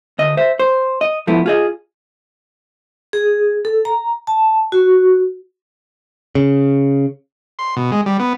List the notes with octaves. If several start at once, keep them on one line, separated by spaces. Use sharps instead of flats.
D2 D#5
C5 E5
C5
D#5
F3 A3 B3 E4
F4 G#4 D#5
G#4
A4
A#5
A5
F#4
C#3
C6
B2
G#3
G3
B3